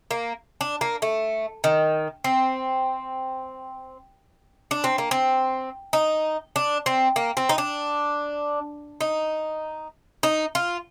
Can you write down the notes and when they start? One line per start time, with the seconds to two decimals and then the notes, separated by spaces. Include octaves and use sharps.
0.11 A#3
0.61 D4
0.81 A#3
1.02 A3
1.64 D#3
2.24 C4
4.71 D4
4.84 C4
4.98 A#3
5.11 C4
5.93 D#4
6.56 D4
6.86 C4
7.16 A#3
7.37 C4
7.49 D#4
7.58 D4
9.01 D#4
10.23 D#4
10.55 F4